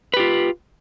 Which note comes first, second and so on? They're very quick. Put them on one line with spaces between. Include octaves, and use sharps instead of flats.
B4 G4 F4